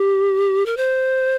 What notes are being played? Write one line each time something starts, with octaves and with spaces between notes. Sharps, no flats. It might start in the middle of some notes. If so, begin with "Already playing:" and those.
Already playing: G4
A#4
C5